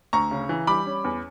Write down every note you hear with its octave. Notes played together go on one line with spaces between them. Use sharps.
D2 A#5 C#6
C#3
E3
G3 B5 D6
C#4
E2